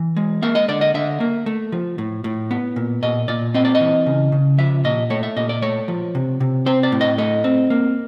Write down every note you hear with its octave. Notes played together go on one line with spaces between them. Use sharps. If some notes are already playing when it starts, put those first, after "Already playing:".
Already playing: E3
G#3
A#3 E5
D#5
D3 D5
D#5
D3 E5
A#3
A3
F3
A2
A2
B3
A#2
A#2 D#5
A#2 D5
C4 D#5
D5
D#5
E3
C#3
C#3
F3 E5
A#2 D#5
A3 C#5
E5
A#2 D#5
D5
A3 C#5
F3
C3
C3
C4 C5
D5
A2
D#5
A3 D#5
C4
A#3